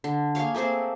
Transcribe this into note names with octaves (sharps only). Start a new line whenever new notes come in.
D3
A#3 G#4 C#5 F5
A3 A#3 C4 G#4